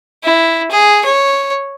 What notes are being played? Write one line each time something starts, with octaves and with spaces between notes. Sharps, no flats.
E4
G#4
C#5